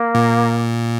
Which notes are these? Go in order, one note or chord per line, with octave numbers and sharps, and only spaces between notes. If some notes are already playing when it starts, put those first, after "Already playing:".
Already playing: A#3
A#2